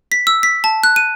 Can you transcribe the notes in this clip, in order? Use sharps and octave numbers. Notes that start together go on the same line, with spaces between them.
B6
E6
B6
A5
F#6
D#7